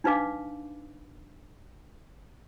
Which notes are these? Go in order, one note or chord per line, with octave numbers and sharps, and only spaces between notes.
D4 D#4 B4 F5 D6